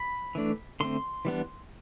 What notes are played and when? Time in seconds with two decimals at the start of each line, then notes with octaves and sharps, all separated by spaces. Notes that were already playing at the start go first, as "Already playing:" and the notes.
Already playing: B5
0.35 E3 A3 D4
0.80 D3 A3 C4 C6
1.25 E3 G3 B3 D4